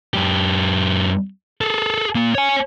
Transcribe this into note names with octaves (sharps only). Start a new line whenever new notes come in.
F#2 G4
G#4 A4
A#3 F4
C#5 G#5